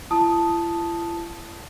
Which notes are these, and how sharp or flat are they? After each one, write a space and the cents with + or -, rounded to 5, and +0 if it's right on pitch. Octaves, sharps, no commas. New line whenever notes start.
E4 +45 A5 +0 D#6 +0